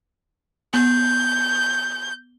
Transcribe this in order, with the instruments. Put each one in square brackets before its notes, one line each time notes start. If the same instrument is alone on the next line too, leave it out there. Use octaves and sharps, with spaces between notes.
[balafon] B3 [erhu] G6